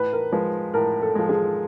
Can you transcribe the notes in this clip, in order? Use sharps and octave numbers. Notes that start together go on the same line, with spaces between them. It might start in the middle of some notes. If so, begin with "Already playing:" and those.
Already playing: A2 B4
A#4
F3 G#3 B4
A2 A#4
A4
F3 G#3
G#4